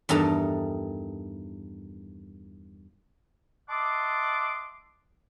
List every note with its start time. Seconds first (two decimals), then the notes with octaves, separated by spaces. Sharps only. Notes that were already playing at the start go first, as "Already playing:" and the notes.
0.09 E2 G2 D#3 A4 A#5
3.69 D#5 E5 F#5 A5 C6 D6